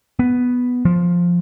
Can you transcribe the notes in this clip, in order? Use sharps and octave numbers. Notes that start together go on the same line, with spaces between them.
B3
F3